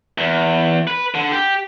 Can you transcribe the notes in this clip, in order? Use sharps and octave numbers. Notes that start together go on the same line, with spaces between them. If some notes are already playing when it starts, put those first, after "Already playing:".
E2
B4
D3
G4